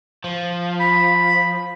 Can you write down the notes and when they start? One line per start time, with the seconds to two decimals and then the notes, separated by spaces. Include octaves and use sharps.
0.24 F3
0.80 B5